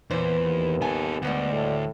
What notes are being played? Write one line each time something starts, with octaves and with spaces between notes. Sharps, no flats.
E2 A#2 B4 C5
D#2
B3 A4 G#5
D2 G3 G#3 B3 F#5
A2